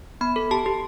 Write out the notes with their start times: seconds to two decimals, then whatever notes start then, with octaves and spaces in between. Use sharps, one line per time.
0.21 B3 B5
0.36 A4
0.51 G4 A5
0.66 G4